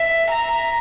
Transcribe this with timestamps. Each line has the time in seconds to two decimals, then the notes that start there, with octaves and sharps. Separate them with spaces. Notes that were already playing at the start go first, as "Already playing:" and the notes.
Already playing: E5
0.31 A#5